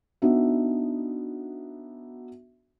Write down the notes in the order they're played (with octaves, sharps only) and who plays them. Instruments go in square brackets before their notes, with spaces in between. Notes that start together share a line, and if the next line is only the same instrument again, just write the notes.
[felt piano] B3 D4 D#4 F#4 E5